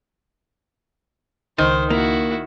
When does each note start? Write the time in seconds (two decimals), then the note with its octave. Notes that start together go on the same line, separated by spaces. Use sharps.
1.58 C#2 D#3 D#4 C5
1.90 A#3 E4 F#4